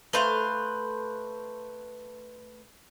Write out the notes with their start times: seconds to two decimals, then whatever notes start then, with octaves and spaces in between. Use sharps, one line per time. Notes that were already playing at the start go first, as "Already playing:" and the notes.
0.13 A3 B4 C5 F5